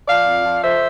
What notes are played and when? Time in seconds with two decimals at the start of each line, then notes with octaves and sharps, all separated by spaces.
0.08 F3 D5 F5
0.26 F2
0.45 F3
0.62 F2 C5 E5